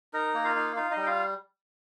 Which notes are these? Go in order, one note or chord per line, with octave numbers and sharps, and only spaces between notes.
D#4 A#4 A#5
A#3
F4 F5
D#4
D#4 F4 F5
D#4 D#5
G3
G5
F4 F5